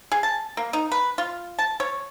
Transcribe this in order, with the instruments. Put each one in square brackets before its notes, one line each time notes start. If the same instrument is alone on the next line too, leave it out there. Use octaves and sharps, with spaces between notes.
[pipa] G#4
A5
A#3
D#4
B4
F4
A5
C#5